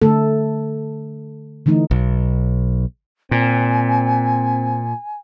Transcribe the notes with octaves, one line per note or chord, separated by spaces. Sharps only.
D3 A3 A4
D3 E3 A3 D#4
B1
A#2 C4 G#5